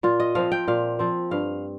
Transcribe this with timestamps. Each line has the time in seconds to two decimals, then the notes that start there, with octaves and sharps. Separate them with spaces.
0.03 A#2 F4
0.20 D#5
0.35 F3 C4 F5
0.52 G5
0.68 A#2 F5
0.99 F3 C4
1.31 G2 F5